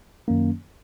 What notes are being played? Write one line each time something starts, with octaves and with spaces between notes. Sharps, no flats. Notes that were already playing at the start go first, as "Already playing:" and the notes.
F#2 D#3 F#3 A#3 C#4